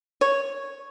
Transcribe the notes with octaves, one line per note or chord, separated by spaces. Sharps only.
C#5